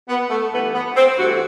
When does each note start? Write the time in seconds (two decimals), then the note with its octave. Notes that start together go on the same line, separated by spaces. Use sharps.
0.09 B3
0.30 A3
0.52 G2 E3 A3 B3
0.74 B3
0.96 C4
1.18 G2 E3 A3 F#4